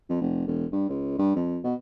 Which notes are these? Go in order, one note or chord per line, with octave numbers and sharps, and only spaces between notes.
F2
F1
E1
G2
C#2
G2
F2
B2